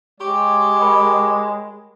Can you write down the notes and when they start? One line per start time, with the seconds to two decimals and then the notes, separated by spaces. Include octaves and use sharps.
0.20 G#3 G4 C#5 C#6
0.81 A#4 G5 B5